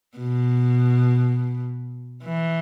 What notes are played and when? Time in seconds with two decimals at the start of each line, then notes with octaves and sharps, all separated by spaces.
0.18 B2
2.23 E3